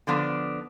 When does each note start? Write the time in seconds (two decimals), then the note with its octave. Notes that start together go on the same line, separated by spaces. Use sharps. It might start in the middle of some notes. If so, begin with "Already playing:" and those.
0.07 D3 F3 B3 D4